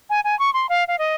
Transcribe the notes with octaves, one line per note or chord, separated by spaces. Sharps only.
G#5
G#5
C#6
C6
F5
F5
D#5